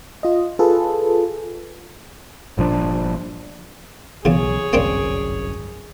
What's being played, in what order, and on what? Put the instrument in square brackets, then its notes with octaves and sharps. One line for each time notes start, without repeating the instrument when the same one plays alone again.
[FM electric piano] F4 D#5
F4 G#4 A4 B4
[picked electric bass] G1 A#2 F3 D4
[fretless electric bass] B1 [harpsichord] E2 C#3 [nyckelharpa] G#4 C#5
[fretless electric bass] G1 C2 F#2 [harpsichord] A#3 C4 D4